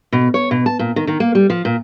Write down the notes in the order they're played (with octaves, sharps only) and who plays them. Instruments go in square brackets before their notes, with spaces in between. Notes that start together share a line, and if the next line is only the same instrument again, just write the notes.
[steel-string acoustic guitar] B2
C#5
B2
A5
A#2
D#3
D#3
A#3
G3
F3
A#2